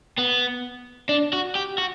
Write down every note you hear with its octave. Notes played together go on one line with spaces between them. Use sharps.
B3
D4
F#4
G4
F#4